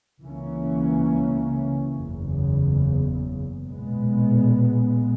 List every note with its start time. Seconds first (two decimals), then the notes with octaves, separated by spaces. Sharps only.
0.20 C#2 C#3 E3 A#3 C#4
1.94 F#1 E2 C#3
3.67 B1 A#2 G#3 B3